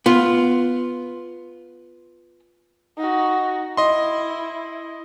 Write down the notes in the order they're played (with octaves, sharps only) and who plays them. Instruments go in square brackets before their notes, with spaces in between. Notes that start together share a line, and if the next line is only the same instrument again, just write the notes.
[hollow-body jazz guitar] B3 F4
[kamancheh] D#4 F#4
[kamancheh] E4 [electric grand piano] D#5 C6